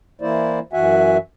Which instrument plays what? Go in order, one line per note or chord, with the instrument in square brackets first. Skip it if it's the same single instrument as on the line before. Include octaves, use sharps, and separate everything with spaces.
[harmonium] E3 A#3 E4 C5 D5
F#2 E3 F#4 E5 F#5 G#5